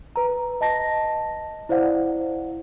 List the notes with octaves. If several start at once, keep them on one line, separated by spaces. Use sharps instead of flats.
B4 A#5
D#5 A5 A#6
E4 C5 D5 F5 F#5